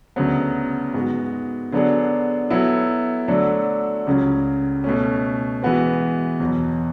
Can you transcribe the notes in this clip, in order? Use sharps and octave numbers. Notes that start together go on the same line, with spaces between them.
D2 C#3 F#3 B3
G#2 G#3 B3 F#4
D3 F#3 B3 D4 G#4
F#3 B3 E4 A4
D3 F#3 A3 D4 A4
C#2 C#3 F#3 C#4
B2 A3 C#4
E3 G#3 B3 F#4 B4
E2 B2 F#3